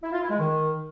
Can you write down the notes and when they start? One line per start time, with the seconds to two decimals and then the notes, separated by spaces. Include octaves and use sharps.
0.03 E4
0.12 F4
0.21 E4
0.30 G#3
0.39 D#3